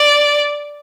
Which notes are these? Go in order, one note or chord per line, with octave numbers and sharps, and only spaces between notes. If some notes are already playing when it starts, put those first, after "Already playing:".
Already playing: D5